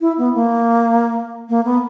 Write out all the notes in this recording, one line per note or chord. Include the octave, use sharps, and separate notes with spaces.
E4
B3
A#3
A#3
B3